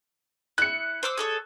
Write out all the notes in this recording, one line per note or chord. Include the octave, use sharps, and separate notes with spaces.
E4 F#6 C#7
C5 D6 E6
G#4 A4 C#5